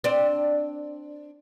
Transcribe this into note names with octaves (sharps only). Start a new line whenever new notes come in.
C4 D4